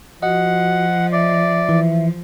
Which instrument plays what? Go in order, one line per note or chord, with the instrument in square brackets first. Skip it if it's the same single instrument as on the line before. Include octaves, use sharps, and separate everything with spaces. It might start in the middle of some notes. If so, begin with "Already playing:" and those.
[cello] F3 [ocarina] F#4 [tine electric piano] D#5 [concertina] F#5
[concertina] D5 [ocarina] E5
[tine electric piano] E3